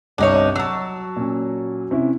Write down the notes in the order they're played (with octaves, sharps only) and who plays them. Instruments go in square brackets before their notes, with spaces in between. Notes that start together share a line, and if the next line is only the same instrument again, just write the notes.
[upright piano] G1 C2 C3 [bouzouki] D4 D#4 C#5
[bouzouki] F#3 A5 [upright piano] E6
[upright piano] A#2 C#4
C3 C#4 E4